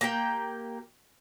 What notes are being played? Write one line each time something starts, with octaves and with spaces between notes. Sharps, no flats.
A#3 G4 G5